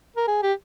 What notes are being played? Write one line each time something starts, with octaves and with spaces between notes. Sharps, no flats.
A#4
G#4
G4